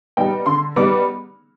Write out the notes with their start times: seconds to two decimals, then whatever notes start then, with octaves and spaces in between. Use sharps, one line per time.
0.17 G3 B3 D#4 G5
0.46 D3 C6
0.76 G3 B3 D#4 D6